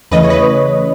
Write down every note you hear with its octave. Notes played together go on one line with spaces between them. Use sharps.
E2 C#3 E3 A3 B4 D#5
C#5
B4 D#5